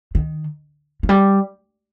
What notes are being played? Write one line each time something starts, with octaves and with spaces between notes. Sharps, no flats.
D#3
F3
G3